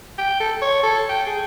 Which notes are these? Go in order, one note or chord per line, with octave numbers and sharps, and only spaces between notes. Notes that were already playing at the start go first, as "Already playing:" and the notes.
G5
A4
C#5
A4
G5
G#4